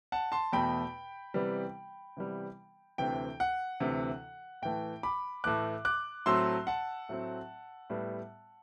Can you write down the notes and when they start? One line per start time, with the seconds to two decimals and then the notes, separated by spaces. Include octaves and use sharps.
0.12 F#5 A5
0.32 A5 C6
0.53 E2 B2 A3 G5 B5
1.34 C3 E3 G3 B3
2.17 C3 E3 G3 B3
2.98 D2 C3 E3 G5
3.40 F#5
3.80 D2 C3 E3
4.62 A2 E3 A3 G5
5.03 B5 D6
5.44 A2 E3 A3 D6 F#6
5.85 D6 F#6
6.26 A2 F#3 A3 C4 C6 E6
6.67 F#5 A5
7.09 A2 F#3 A3 C4
7.90 A2 G3 B3